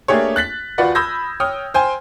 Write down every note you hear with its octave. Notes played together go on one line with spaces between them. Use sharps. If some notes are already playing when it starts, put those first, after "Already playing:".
A3 A#3 D4 G4 G#4 C#5
F#6 A6 B6 F#7
D#1 F4 F#4 B4 D5 F#5
B5 D#6 E6 G6 G#6 A#6
C#5 G5 D#6 F6
C5 G5 G#5